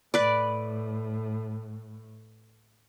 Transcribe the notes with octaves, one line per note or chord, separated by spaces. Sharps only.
A2 B4 D5